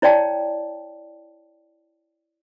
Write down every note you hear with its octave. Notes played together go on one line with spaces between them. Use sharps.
E4 C#5 D5 G5 A5